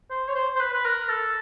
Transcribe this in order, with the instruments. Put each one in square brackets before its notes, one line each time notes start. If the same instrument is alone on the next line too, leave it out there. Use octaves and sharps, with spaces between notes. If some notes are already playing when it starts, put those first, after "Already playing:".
[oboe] C5
C#5
C5
C5
B4
B4
A#4
A4